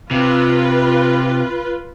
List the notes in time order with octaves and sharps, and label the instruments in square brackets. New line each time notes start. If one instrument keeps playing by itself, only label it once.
[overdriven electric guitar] C3 [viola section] F4 B4